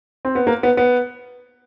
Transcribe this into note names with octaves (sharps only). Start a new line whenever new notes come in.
C4
B3
A#3
B3
B3